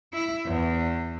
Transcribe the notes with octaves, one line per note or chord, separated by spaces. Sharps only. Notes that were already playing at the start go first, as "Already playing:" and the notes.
E4
E2